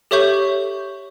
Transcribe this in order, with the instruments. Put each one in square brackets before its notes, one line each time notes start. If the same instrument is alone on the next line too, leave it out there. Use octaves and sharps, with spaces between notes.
[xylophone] G4 A4 C#5 E5 C#6 G6